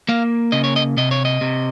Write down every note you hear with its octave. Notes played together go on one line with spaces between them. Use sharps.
A#3 F5
C#3 D#5
C#5
D#5
C3 D#5
C#5
D#5
C3